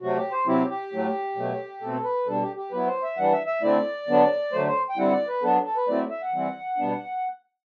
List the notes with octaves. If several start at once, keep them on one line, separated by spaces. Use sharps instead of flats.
C3 F#3 A3 F#4
G4
C5
C3 F#3 C4 E4 G4
G4
A2 F#3 A3
B2 F#3 A3
B2 A3 C4 A4
B4
B2 G3 D4 A4
G4
G4
F#3 B3 E4 B4
C5
E5
E3 G3 D4 F#5
E5
E5
D3 A3 C4 E4 D5
D3 F#3 B3 D4
D3 F#3 A3 C5
C5
G5
D3 G3 C4 E4 F#5
D5
B4
F#3 B3 D4 A4
A4
B4
F#3 A3 C4 E4 D5
E5
F#5
E3 G3 C4 E4
B2 G3 B3 D4